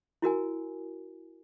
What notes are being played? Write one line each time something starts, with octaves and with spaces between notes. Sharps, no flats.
E4 F#4 A#4 G#5